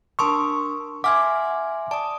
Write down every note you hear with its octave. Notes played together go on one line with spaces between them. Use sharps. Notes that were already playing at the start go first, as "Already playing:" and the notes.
D4 A#4 A5 C6 C#6 D#6 E6
E5 F#5 G#5 C6 D6 F6 G#6
D5 A5 D#6